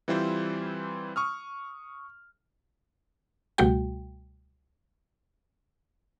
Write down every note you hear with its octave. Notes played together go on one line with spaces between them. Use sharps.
E3 G3 C4 E4 F4 C5
C#6 D#6 F6
C#2 B2 G3 A3 F#4 G5